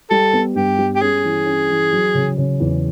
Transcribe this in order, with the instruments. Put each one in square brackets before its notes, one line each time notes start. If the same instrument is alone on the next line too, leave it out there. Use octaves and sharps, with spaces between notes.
[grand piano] G3 [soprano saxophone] A4
[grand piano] B3
[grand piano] G2 [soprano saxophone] G4
[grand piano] G3
[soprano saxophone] G4
[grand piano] C#4 [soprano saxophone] G#4
[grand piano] E3
C#4
E3
F#3
C#3
C#3
E2